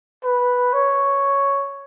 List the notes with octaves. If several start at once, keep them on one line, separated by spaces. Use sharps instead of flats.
B4
C#5